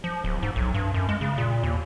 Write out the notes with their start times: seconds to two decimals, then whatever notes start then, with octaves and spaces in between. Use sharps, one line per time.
0.04 F3
0.24 D1
0.43 G#2
0.56 B1
0.74 G2
0.94 F#2
1.09 G#3
1.21 C#3
1.38 A#2
1.63 D#2